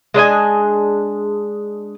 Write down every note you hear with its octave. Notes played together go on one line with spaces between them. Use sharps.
G#3 D4 D#5 G#5